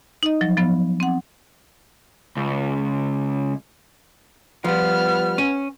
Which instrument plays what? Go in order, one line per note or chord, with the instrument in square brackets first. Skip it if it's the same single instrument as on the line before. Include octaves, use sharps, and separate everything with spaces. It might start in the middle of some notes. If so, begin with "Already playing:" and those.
[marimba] D#4 D#5
F3 F#3
F3 B3
C4 F#5
[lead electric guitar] C#2
[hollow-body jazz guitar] F3 G3 [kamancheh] B3 F6
[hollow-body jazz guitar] C#4